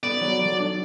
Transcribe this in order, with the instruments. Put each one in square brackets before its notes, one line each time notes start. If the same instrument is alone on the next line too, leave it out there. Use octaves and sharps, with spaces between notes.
[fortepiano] B3 [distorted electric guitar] D5
[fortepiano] F#3
F#3
D4